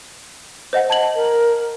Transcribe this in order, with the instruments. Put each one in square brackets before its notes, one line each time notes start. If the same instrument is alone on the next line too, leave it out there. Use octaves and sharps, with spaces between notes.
[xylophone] C5 D#5 F#5
A5 G#6 F#7
[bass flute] A#4